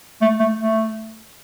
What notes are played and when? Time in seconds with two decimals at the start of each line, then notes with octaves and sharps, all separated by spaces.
0.22 A3
0.40 A3
0.59 A3